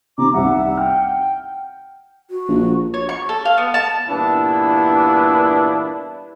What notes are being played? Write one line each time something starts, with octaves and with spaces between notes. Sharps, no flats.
C3 A#5 D6
C2 D#3 G3 E5 F#5
G5 F6
F#4
A#1
C#5
C#6
A4
F5
B3
A5
G2 A#2 E3 B3 D4 E4